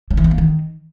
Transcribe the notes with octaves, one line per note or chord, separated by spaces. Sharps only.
F#3
E3
B3
A#3
D#3